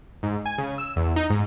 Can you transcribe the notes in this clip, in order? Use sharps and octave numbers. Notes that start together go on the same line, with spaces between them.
G#2
G#5
C#3
E6
E2
D#4
G#2